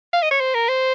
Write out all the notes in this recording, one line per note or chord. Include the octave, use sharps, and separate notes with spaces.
F5
D#5
C#5
C5
A#4
C5